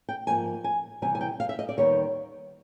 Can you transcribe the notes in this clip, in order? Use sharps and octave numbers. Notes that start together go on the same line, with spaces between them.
G5
G#2 F3 A#3 G#5
G#5
C3 E3 G3 B3 G#5
G#5
G5
F5
E5
D#5
D5
D#2 D#3 G3 B3 C#5